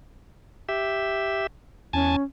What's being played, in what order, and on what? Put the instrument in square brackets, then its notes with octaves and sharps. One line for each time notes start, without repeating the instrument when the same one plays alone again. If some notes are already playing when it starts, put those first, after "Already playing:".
[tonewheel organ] G4 E5
[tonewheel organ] E2 G#5 A5 [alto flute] C#4